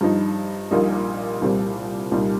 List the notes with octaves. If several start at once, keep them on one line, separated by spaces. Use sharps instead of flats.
G2 F3 D#4
A#1 A#2 G3 A#3 D#4
C2 A#2 G3 C4
C2 A#2 G3 D#4